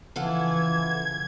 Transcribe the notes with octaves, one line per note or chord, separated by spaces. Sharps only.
C#3 E3 F3 F4 A4 F#5 G#6